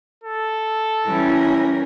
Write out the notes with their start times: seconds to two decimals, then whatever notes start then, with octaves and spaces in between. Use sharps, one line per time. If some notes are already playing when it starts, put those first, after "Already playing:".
0.24 A4
1.07 E3 G3 C#4 A#4